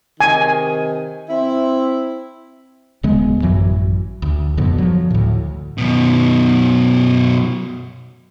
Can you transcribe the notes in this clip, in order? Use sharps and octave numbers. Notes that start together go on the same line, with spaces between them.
C3 D#3 G#5
C4 E4
D1 C#3 G#3 B3
A1 F#2 E3 F#3
D2
F2 G#2 B2 D3
F3 F#3
D2 A2
F#2 B2